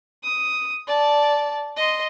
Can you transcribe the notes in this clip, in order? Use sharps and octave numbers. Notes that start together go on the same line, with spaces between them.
D#6
D5 A5
D#5 C6